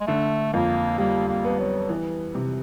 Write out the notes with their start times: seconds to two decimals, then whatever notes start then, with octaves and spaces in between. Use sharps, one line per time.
0.01 G#3
0.07 D3 A3
0.53 F2 A#3
0.98 G3 A#3
1.29 A#3
1.45 B3
1.59 F#3
1.89 E3
2.35 C3